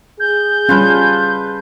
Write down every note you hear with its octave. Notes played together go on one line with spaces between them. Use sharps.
G#4 G6
G3 C#4 F4 B4 A5